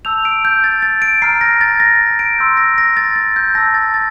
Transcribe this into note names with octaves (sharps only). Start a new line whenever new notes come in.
A5 E6 G6 F7
D7
G6
A6
A6
D7
A#5 F6 C7
A#6
A6
A#6
D7
C6 E6 G6
A#6
A#6
A6
A6
G6
A5 E6 G6 A#6
A6
A6